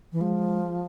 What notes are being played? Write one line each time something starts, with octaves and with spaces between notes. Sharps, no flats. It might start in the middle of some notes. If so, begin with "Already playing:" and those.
E3
F3 G#3